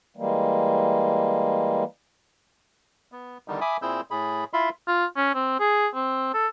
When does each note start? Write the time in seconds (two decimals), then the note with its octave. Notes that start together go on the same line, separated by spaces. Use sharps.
0.17 E3 G3 G#3 A#3
3.12 B3
3.48 E2 D3 D#3 G3 D#4
3.61 E5 G#5 B5 D6 D#6
3.82 A#2 C4 E4 G#4 E6 G6
4.11 A2 G#4 B5
4.53 E4 F4 E5 F5 B5 C6
4.87 F4
5.17 C#4
5.35 C4
5.60 G#4
5.95 C4
6.34 A4